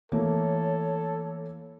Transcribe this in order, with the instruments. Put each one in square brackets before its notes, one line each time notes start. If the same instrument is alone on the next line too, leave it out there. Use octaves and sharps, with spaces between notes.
[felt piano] E3 A3 A#3 [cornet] A4 [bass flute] C#5